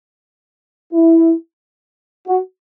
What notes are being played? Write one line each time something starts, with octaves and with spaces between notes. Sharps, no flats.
E4
F#4